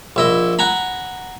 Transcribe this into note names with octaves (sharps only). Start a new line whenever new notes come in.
A#1 E4 D#5
F#5 G#5 A#5 B5